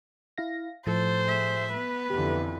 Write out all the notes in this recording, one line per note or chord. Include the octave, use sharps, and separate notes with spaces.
E4 F5 A#6
A2 F3 A3 A4 C5
G#4 E5
B3 B4
F2 D3 E3 G4